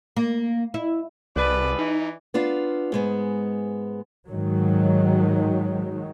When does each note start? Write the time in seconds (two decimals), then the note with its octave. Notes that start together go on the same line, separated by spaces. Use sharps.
0.17 A#3
0.74 E4
1.36 C2 B2 G#4 B4 D5
1.79 E3 D#4
2.34 B3 D4 F4 F5
2.92 G#2 G#3 B3
4.29 G#2 D#3 F#3